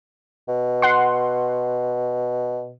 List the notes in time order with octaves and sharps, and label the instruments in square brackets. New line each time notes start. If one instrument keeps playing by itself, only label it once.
[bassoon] B2
[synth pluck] F#5 C6